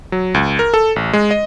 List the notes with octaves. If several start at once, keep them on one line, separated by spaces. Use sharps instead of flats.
F#3
C#2
A#4
A4
A1
G#3
D#5